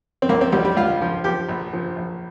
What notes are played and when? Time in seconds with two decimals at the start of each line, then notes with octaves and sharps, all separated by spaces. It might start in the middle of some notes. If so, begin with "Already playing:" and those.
0.22 C4
0.29 C#2 A#3
0.41 C4
0.52 C#2 G3
0.65 G3
0.77 C#2 F4
1.01 F3
1.24 F3 G4
1.49 A#1
1.73 F3
1.96 A#1